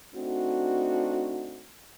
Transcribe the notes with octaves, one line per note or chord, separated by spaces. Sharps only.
A3 C4 D4 D#4 F#4